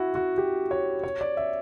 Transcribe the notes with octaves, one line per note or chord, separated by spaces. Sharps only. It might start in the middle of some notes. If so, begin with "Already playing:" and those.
Already playing: E4 F#4
F#4
G4
C#5
C#5
D5
E5